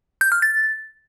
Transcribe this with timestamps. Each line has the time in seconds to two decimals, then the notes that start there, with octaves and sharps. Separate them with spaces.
0.21 G6
0.32 F6
0.42 A6